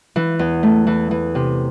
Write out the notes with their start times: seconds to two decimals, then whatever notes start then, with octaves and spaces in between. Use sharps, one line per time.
0.16 E3
0.39 E2
0.63 A3
0.87 E3
1.11 E3
1.35 C3